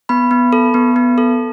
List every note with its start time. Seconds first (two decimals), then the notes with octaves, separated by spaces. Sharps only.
0.09 B3 B5
0.31 B3
0.53 A4
0.74 B3
0.96 B3
1.18 A4